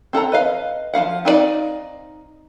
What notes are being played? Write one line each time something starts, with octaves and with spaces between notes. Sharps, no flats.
C4 A4 F#5 A#5
B4 D#5 F5
F3 E4 F5 F#5
C4 D#4 A#4 D5 F5